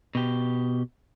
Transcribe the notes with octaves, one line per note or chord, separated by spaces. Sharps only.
B2 G4